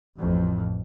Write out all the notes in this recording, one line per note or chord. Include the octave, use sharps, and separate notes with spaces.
A1 F2 A2